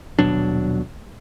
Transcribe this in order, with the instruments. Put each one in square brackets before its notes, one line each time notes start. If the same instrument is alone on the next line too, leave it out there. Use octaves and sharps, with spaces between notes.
[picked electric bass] D#1 B2 F#3 D4